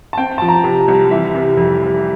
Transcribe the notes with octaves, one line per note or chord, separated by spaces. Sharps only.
A5
C4 G5
F3 A5
A#5
C3
C2
E3 E5
C3
F2
F1